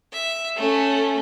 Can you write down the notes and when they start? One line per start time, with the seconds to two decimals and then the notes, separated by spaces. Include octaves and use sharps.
0.13 E5
0.56 A3 C#4